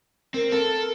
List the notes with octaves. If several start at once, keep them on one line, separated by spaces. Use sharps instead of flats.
C4 A#4
A4